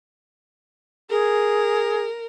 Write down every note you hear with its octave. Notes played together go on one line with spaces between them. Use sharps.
G#4 A#4